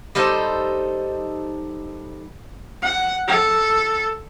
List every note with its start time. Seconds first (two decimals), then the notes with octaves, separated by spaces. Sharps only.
0.15 G3 D#4 A4 C5
2.82 F#5
3.27 A4